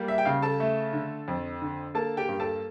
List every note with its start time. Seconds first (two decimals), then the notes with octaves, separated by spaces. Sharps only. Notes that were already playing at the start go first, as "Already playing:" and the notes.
Already playing: G3 A#3
0.08 E5
0.18 G5
0.25 C#3 F5
0.42 A4 A5
0.60 A3
0.93 D3
1.28 F2
1.62 D3
1.95 A#3 A4 A5
2.17 G4 G5
2.29 G2
2.40 A4 A5